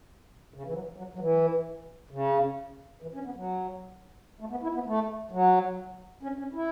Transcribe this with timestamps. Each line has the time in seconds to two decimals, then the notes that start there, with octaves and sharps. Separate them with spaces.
0.54 C#3
0.64 E3
0.73 F#3
0.96 F#3
1.15 F#3
1.19 E3
2.11 C#3
3.02 E3
3.14 C#4
3.25 B3
3.36 F#3
4.40 A3
4.51 B3
4.63 E4
4.74 B3
4.86 A3
5.31 F#3
6.23 C#4
6.39 C#4
6.54 E4